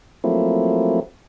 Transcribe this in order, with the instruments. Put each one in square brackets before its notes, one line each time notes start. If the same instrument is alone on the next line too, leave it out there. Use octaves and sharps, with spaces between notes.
[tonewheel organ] F3 F#3 A3 A#3 C4 E4